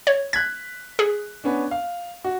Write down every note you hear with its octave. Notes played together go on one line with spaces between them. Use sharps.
C#5
F#6 G#6 B6
G#4
B3 C#4 D4
F5
F#4